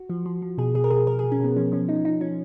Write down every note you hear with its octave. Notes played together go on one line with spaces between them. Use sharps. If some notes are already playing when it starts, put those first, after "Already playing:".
Already playing: F#4
F3
F3
F3
B2 G#4
B2 G#4
A#4
B2 G#4
B2 A#4
B2 G#4
C#4
B2 B3
F3 C#4
F3 C#4
F3 D#4
F3 D#4
F3 C#4